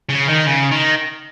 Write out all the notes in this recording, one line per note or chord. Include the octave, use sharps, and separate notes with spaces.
C#3
D#3
C#3
D#3